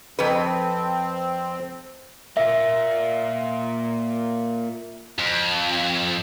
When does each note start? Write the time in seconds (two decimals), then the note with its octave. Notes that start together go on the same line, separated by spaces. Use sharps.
0.19 F2 C4 B4
2.37 A#3 F4 E5
5.18 F2